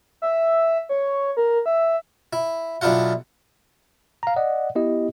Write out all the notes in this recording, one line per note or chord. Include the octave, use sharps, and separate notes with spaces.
E5
C#5
A#4
E5
E4
B1 D4 E4 F4 F#5
F5 A#5
D5 D#5 F#5
B3 E4 G4 D#5